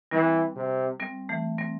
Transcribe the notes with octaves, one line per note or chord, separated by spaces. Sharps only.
E3 G3 C4
C3
G3 C4
E3 A3
G3 C4